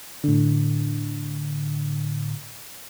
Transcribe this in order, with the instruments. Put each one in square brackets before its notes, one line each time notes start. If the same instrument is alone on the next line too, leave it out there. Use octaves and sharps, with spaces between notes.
[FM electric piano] A2 D3